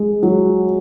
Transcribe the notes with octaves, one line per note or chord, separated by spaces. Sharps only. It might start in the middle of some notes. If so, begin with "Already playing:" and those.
Already playing: G#3
F#3